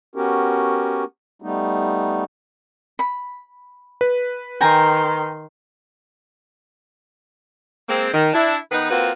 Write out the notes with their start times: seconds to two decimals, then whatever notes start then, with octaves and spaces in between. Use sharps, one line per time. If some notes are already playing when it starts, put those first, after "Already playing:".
0.15 B3 C#4 F#4 G4 A#4
1.42 G3 A3 B3 D#4
2.99 B5
4.01 B4
4.61 D#3 G5 G#5 A#5 C6
7.89 G#3 A#3 C4
8.14 D#3
8.34 D4 E4
8.72 D#3 B3 D#4 B4
8.90 A#3 C4 F4 F#4 B4